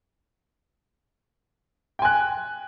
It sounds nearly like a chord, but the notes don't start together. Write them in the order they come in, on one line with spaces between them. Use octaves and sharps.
G5 G#5 F#6